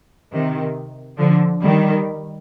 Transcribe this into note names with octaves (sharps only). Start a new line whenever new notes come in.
C3 D#3
D3 F3
D#3 G3